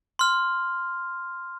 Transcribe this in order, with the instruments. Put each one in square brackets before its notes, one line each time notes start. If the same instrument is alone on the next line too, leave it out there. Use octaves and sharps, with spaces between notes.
[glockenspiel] C6 F6